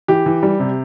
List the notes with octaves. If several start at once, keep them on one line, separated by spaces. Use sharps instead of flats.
E3 G4
E3
G3
C3